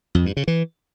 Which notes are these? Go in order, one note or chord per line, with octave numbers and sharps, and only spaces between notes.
F2
G2
C#3
E3